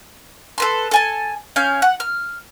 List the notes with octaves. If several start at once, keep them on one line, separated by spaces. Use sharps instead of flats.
A4 B4 C6
A4 G#5 A5
C#4 F5 G#5 G6
F#5
F6